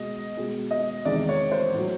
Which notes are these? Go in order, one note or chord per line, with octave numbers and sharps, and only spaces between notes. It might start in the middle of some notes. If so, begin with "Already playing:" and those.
Already playing: B2 G#3 D#5
B2 G#3
D#5
E2 C3 D#3 G#3 D5
C#5
C5
A2
F#3